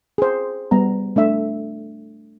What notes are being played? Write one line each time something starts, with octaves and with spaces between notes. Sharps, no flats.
G#4 C5
G3 B3 A#5
A3 D4 E5